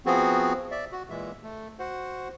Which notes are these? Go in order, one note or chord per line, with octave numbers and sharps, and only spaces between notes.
F3 B3 C4 F#4 G#4
D5 E5
F#4
A#2 E3 G#3 E5
A3
F#4 C5 F#5